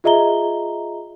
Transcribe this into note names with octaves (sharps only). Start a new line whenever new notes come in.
F4 G#4 D#5 E5 A#5 G7